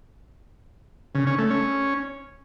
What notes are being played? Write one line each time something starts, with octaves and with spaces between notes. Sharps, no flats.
C#3
C#4
A3
C#4